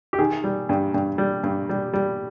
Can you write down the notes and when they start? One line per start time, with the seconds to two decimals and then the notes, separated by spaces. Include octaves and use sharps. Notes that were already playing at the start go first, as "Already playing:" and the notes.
0.13 G4
0.19 D#3 G#4
0.44 G3
0.69 G2
0.94 G2
1.18 G3
1.43 G2
1.69 G3
1.94 G3